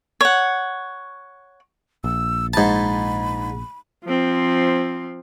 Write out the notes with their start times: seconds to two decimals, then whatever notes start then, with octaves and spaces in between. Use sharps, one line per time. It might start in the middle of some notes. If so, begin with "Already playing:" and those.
0.21 C#5 F#5
2.04 A#1 E6
2.54 G#2 A5 B5
4.05 F3 C4